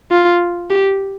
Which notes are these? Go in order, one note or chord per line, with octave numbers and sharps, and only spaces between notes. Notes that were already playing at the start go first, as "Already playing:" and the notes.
F4
G4